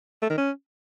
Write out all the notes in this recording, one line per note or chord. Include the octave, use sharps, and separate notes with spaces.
A3
D#3
C#4